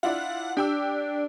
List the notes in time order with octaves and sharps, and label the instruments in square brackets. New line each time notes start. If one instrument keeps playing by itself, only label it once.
[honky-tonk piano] D4 E4 F4 [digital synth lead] F#5
[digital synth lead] D4 [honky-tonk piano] G4 G5 E6